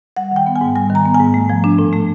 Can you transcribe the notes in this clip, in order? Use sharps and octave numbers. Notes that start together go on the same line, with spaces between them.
G3 F#5
D#3 G5
B3
G#5
G#2
G3 G#5
D#3
A#5
B3
G#5
G#2
A3
F3
D4
A2
A3